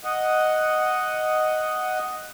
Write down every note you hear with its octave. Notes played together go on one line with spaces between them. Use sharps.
D#5 F#5